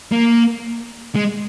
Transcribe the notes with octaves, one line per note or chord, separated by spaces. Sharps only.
A#3
G#3